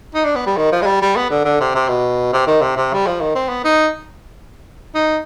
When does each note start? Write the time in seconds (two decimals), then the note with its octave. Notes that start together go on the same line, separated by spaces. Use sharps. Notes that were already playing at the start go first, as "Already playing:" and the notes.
0.15 D#4
0.25 D4
0.36 B3
0.46 G3
0.57 D#3
0.72 F3
0.82 G#3
0.87 G3
1.02 G3
1.16 B3
1.30 D3
1.45 D3
1.60 C3
1.75 C3
1.88 B2
2.33 C3
2.47 D#3
2.61 C3
2.77 C3
2.94 G3
3.07 F3
3.21 D#3
3.35 C4
3.49 B3
3.64 D#4
4.95 D#4